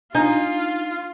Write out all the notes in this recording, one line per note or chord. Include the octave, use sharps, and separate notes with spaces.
D4 D#4 F4